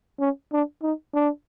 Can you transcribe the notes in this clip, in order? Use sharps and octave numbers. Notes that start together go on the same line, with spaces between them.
C#4
D4
D#4
D4